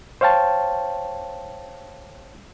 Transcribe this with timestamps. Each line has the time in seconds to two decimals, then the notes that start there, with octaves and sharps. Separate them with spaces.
0.21 C5 C#5 F5 G5 A5